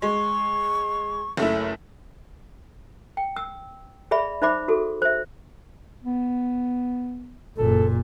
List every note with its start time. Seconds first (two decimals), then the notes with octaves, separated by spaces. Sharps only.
0.02 G#3 C#6
1.37 F#1 A3 E4
3.17 G5
3.36 E6
4.11 G#4 D5 E5 B5
4.42 D#4 C5 E5 B5 D6
4.68 F#4 G#4 A4
5.02 C5 E5
6.04 B3
7.58 F#1 A#2 A4